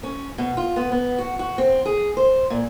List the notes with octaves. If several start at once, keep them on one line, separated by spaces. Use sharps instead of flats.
C#4
B2
F4
B3
B3
F#4
F#4
C4
G#4
C5
A#2